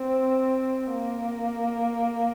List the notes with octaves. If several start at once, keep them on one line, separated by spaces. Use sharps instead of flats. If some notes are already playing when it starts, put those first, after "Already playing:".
Already playing: C4
A#3